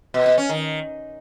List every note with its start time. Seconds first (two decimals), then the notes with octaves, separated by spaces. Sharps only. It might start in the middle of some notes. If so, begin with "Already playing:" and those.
0.14 B2
0.26 B2
0.38 C#4
0.49 D#3